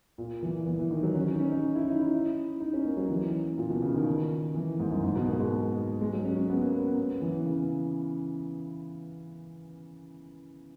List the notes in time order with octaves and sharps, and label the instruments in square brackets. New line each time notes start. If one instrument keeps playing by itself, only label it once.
[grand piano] A#2
E3
E3
E3
D#3
F#3
C#4
D#4
C#4
D#4
E4
D#4
E4
D#4
C#4
A#3
F#3
E3
A#2
B2
C#3
D#3
E3
G#2
F#2
G#2
B2
A#3
G#3
G#3
F#3
C#4
C#4
B3
A#3
B3
B3
E3
C#3